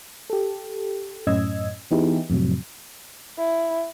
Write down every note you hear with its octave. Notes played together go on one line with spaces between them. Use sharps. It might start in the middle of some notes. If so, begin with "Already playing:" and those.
G4 A4
F#2 A2 C#4 D#5 E6 G#6
E3 B3 D#4 E4 G4 G#4
F2 A2 C3 F#3
E4